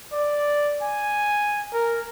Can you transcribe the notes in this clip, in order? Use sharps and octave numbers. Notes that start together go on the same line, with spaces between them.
D5
G#5
A#4